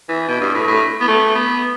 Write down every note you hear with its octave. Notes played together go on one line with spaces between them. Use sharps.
E3
B2
G2
A2
A2
B3
A3
B3